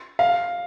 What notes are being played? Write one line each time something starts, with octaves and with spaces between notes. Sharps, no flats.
F5